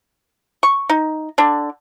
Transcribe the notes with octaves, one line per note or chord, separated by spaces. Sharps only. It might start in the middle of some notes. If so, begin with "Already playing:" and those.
C#6
D#4
D3 D4